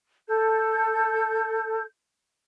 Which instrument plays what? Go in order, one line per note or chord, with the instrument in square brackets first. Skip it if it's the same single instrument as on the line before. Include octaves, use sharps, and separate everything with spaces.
[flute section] A4 G6